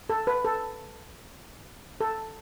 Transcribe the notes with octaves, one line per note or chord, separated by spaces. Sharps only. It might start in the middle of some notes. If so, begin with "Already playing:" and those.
A4
B4
A4
A4